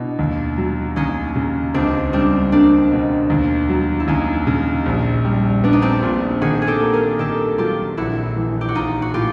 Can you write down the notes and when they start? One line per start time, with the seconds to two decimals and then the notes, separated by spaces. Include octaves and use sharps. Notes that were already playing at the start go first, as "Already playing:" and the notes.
Already playing: B2 D4 E4
0.19 D#2
0.58 F#3
0.96 D#2 C#4 D#4
1.36 C#3
1.74 C#2 C4 D4
2.13 G3 C4 D4
2.52 A#3 C4 D4
2.92 B2
3.30 D#2
3.69 F#3
4.00 E4
4.08 D#2 C#4 D#4
4.47 C#3
4.86 A#1
5.25 G3
5.64 B3 D4
5.73 D#4
5.82 C4 D4
6.03 A#2
6.42 D#3 F#4 G#4
6.62 G#4
6.67 G4 A4
6.81 A#3
6.93 G#4 A#4
7.19 D#3 G4 A4
7.58 F#3 F4 G4
7.97 A#1 E4 F#4
8.36 E3
8.61 G4
8.68 F#4
8.75 A#1 D#4 F4
9.02 F#4
9.14 A2 F4 G4